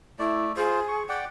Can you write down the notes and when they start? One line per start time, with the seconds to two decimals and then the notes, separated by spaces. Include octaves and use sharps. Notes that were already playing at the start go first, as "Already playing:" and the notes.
0.19 A3 E4 D5
0.57 F4 G#4 C5
0.88 C#6
1.09 D5 F#5 G5 D6